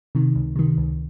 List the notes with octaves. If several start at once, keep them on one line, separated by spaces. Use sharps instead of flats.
C3 D#3
C#2
C3 D#3
C#2